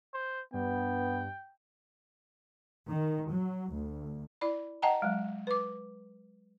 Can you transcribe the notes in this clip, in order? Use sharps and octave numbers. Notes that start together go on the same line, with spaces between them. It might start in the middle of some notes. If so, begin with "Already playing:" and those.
C5
G2 B3 G5
D#3
F#3
D2
E4 D5 B5
D#5 F#5 G5 A5 A#5
F#3 G#3
B4 D6